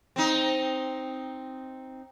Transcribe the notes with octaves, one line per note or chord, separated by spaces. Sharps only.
C4 D#4